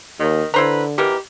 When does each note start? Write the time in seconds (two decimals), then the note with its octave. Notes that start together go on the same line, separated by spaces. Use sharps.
0.20 D#2 D#3
0.54 D3 E4 B4 C5 A#5
0.98 B2 E3 G4 A#4